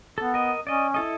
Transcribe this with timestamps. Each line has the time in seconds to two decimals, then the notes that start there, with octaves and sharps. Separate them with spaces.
0.18 B3 A4
0.34 A#4 D#5
0.67 C#4 D5 D#5
0.94 E4 A4 D#5